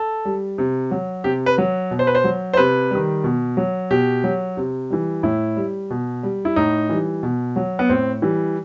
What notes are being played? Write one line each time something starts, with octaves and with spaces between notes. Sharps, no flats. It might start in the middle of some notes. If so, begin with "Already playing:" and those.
Already playing: A4
G3
C3
F#3
C3 G4
B4
F#3
B2
C5
B4
C5
F#3
C5
C3 B4
D#3 G3
B2
F#3
B2 G4
F#3
C3
E3 G3
A2 E4
G3
B2
G3
E4
A2 D#4
E3 G3
B2
F#3
B3
A2 C4
E3 G3